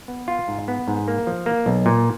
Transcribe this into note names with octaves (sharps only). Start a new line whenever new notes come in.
B3
F4
G#2
B3
G#2
A#3
F3
A#3
B1
A#2